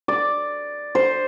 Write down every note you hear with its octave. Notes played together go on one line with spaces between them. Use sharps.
D5
C5